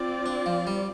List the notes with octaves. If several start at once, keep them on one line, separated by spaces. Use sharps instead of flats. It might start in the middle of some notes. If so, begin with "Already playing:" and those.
Already playing: C4 F4 D5
D4
F3
G3